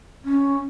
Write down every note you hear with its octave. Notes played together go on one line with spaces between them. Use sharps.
C#4